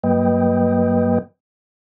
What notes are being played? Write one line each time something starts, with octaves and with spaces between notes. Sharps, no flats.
G2 F#3 A#3 B4 D#5 G5